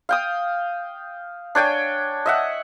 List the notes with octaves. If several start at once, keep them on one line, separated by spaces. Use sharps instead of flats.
F5 G5 D#6
D4 C#5 G5 G#5
D#5 E5 F#5